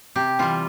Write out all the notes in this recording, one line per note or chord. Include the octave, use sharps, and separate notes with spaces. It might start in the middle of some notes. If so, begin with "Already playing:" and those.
C3 G4
E3 G3 F4